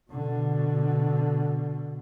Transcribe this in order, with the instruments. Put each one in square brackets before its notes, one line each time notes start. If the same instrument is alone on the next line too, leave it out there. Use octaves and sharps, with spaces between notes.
[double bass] B2 D3